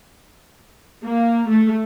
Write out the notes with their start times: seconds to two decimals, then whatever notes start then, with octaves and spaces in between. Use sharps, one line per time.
1.05 A#3
1.49 A3